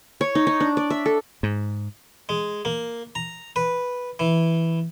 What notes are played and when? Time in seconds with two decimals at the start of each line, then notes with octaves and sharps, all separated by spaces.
0.21 C#5
0.35 D#4
0.47 D#4
0.60 D4
0.77 D5
0.90 E5
1.06 A4
1.43 G#2
2.29 G#3
2.65 A#3
3.15 A#5
3.56 B4
4.19 E3